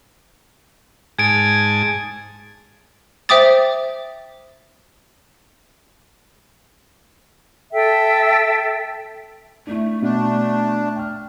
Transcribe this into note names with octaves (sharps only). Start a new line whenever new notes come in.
G#2 G#5 A5 G#6 D7
C5 E5 G5 D6 D#6 A6
A4 E5 G5
A3 D4 E4
B2 D4
G5 F6